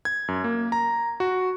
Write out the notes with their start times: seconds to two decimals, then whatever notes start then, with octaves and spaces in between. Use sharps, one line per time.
0.05 G#6
0.28 F#2
0.44 A#3
0.72 A#5
1.20 F#4